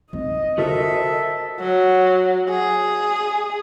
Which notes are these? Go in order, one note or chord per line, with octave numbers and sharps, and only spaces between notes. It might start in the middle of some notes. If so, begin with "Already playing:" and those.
C4 D#4 D#5
D3 F#4 A4 A#4 C5 E5
F#3
G#4